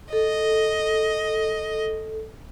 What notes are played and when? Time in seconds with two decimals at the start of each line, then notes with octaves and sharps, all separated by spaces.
0.13 A4 D#5